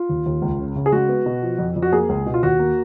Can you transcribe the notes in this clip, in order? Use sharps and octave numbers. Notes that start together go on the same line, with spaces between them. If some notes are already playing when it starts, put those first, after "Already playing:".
Already playing: F4
D#2
D#2
C#2
C#3
C#3
G#4
G#3 F#4
B3
B2
F3
F2
F2
F#4
A#3 G#4
C#2
B2
F4
D#2 F#4
A#3